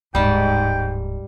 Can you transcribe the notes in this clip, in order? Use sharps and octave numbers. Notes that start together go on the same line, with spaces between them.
D1 G#2 G3 G5 A5